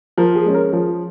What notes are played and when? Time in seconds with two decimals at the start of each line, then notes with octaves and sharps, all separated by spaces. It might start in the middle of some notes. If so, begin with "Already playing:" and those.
0.18 F3 A#4
0.35 G#4
0.45 G#3 C#4
0.54 A#4
0.72 F3 G#4